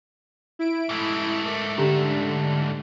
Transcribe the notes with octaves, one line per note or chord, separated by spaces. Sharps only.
E4 D7
G#2 A3
A#4 D6
D3 C#4 G4 A#5